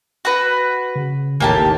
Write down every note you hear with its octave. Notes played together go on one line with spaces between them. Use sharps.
F#4 B4
C#3
A1 D#2 A2 D#3 A#3 G4 A5